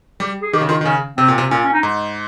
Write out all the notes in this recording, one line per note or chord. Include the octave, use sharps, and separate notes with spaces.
G3 G4
G#4
D#3 G4
C#3
D#3 F4
D#3
C#3 C#4
C3 C4
A#2
C3
A#2 C#4
C#4
D#4
G#2